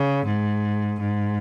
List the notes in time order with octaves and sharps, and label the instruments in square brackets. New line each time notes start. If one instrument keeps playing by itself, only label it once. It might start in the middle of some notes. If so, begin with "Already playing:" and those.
Already playing: [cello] C#3
G#2
G#2